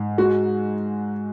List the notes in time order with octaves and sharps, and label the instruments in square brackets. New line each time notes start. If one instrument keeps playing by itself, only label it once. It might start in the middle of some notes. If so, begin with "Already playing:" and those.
Already playing: [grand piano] G#2
G#3 F#4